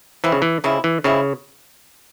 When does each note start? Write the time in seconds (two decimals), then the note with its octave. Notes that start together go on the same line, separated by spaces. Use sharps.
0.24 E3 F3 G#3 C4 E4
0.32 C#3
0.42 E3
0.64 C#3 F3 G#3 C4 E4
0.84 E3
1.04 C#3 F3 G#3 C4 E4